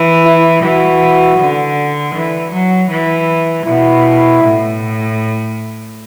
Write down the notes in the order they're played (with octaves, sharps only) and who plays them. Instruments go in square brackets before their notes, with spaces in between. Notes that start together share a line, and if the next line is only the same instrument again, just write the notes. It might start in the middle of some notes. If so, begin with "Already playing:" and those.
Already playing: [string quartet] E3
[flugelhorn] E4
[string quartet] E3 [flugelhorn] F#4
[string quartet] D3
E3
F#3
E3
[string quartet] B2 [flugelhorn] E4
[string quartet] A2